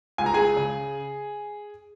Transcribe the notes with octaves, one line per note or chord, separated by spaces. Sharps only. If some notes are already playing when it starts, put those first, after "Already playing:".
C#2 G#5
A#5
G#4 G#5
C#3